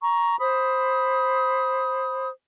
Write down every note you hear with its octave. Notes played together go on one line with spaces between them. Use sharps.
A#5 C#6
C5 B5 D#6